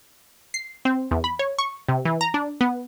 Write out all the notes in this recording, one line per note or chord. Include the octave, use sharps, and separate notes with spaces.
C7
C4
E2
B5
C#5
C#6
C3
E3
A#5
D4
B3